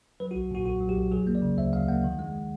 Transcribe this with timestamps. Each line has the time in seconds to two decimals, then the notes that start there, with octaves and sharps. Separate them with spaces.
0.20 F#3 B4
0.31 F#4
0.35 B1
0.51 A#2 F#4
0.65 B1 F#4
0.81 F#3
0.89 G4
0.96 B1
1.12 F#3 G#4
1.27 A#3
1.35 D5
1.42 C#3
1.58 D2 E5
1.73 F#3 F5
1.88 A#3 F#5
2.04 D#3
2.19 G#3